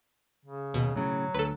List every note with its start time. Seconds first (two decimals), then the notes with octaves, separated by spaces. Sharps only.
0.45 C#3
0.74 D#2 B2
0.96 A2 C#3 F#3
1.34 D2 A4 B4